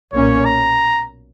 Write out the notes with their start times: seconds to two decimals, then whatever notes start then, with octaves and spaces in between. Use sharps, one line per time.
0.13 B1 A#2 A#3 C#4 C#5
0.46 A#5